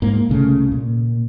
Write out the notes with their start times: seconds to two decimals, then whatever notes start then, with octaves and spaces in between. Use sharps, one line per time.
0.02 G#2 A#3
0.29 C2 C#3 A3
0.72 A#2